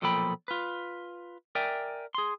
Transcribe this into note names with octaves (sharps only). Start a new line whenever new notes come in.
B1 A#2 F3 A4 G5 B5
F4 B4
A#4 D5 E5 G5 G#5
G#4 C6